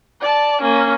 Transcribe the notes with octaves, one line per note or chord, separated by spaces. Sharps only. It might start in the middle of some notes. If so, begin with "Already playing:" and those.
D5 A5
A#3 C#4